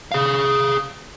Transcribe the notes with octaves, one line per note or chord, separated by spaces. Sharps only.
G#4 F5